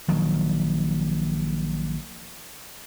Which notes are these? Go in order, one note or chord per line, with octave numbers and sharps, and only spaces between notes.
A#1 D#3 F#3